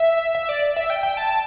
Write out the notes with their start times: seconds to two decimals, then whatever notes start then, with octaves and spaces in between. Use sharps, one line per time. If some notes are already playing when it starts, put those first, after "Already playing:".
Already playing: E5
0.35 E5
0.49 D5
0.76 E5
0.90 G5
1.03 G5
1.17 A5